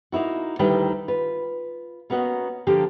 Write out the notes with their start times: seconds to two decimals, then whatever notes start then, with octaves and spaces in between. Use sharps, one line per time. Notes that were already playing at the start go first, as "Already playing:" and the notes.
0.12 A#3 D#4 E4 F#4
0.59 D2 D#3 G3 E4 B4 G5
1.08 F4 B4
2.10 A#3 B3 C#4 F#4 D#5
2.67 D3 F3 A#3 G4